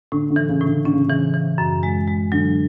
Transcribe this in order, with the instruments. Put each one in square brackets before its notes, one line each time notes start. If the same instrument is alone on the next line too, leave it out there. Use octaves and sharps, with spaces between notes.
[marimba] A2 [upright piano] D3
[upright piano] D3
[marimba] E3
[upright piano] C#3
[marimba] A2
[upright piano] D3
[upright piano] D3 [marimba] C#4
[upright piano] C#3
[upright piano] C#3 [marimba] E3
[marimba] E3
F#2
G#3
G#3
[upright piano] D3 [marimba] F#3